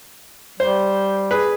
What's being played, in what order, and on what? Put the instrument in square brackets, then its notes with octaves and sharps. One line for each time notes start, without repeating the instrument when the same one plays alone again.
[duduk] G3 [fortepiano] C5
[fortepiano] G#4 B4